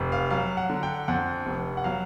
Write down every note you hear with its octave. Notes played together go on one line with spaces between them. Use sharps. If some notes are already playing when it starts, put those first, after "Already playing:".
Already playing: F1
F5
F#3 F5
F#5
D3
G5
F2 F#5
F1
F#5
F#3 F5